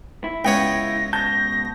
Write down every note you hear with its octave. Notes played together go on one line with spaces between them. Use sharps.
E4
C#2 B3 C#5 G5 G#6 A#6
B2 A5 G6 A#6